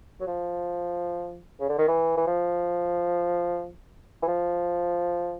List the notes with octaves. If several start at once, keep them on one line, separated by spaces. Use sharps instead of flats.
F#3
F3
C#3
D3
D#3
E3
E3
F3
E3
F3